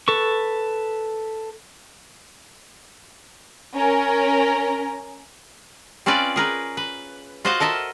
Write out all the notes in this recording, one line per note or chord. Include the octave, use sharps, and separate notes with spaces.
A4 B4 C#6
C#4 A#4
C4 C#4 F4 B4 D5
G#4 A#4 B4
B4
F4 F#4 C5 D#5 F5 F#5
A4 A#4 D#5 E5